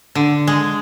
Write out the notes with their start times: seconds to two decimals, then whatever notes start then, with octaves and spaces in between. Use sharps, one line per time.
0.15 D3
0.47 G#3